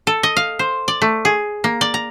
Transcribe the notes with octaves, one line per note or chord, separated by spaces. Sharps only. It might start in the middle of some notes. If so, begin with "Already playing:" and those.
A4
D#5
F5
C5
D5
A3
G#4
A#3
D5
A#5